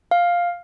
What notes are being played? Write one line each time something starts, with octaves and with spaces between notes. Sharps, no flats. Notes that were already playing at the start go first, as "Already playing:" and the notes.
F5